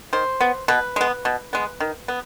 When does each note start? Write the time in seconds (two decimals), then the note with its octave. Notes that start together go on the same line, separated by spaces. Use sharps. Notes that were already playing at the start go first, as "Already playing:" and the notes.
0.13 D#3 C5
0.41 B3
0.68 B2 B4
0.96 G#3 B3
1.25 B2
1.53 G#3 B3
1.80 D#3
2.08 B3